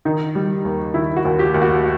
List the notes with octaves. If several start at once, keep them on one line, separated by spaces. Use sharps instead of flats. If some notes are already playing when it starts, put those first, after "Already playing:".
D#3 D#4
G3
D#2
D#3 E4
F#4
D#2
G4
D#2
F#4